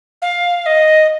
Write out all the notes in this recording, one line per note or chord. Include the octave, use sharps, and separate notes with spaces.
F5
D#5